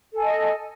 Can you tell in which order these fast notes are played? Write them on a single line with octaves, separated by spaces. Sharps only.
A4 G#5 D#5